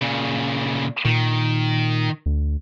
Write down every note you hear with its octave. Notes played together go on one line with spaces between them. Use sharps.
A#2 C#3
A#2 D#3
D2